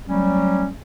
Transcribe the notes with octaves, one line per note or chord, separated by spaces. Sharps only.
F#3 G3 A3 C#4